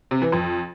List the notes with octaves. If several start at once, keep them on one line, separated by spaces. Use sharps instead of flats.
C3
E3
F2